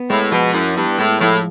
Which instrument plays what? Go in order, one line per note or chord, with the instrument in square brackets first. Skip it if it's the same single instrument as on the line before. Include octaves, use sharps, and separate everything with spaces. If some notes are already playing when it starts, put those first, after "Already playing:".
Already playing: [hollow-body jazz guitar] B3
[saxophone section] A2 [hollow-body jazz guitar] G#3
[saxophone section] B2 [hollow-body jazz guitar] F3
[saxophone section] F#2 [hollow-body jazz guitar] E4
[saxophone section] G2 [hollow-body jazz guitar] B3
[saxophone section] A2 [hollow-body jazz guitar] G#3
[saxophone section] A2 [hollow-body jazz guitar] F3